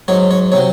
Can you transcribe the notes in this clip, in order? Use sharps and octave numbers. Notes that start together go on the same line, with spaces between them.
G#2 F#3 C#5
C#5
C3 F#3 C#5